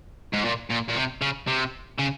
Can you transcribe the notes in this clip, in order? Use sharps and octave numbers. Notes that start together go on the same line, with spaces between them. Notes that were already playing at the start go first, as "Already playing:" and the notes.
G#2
A#2
A#2
A#2
C3
C#3
C3
C#3